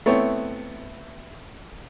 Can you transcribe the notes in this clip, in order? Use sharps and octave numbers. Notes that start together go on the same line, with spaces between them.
A3 B3 C4 E4 C#5